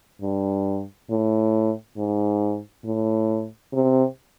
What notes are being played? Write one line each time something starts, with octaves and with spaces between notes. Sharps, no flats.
G2
A2
G#2
A2
C3